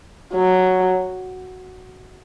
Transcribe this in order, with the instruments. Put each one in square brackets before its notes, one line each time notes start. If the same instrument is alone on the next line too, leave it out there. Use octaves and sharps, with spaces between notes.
[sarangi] F#3